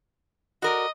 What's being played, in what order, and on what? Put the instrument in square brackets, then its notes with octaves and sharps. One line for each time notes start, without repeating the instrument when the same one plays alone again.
[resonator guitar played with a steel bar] F#4 A#4 D5 [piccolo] D#5